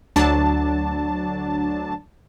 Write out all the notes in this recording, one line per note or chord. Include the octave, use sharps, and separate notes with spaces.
D2 F#3 D4 A5